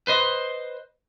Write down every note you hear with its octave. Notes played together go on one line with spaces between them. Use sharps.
B4 C5 D#5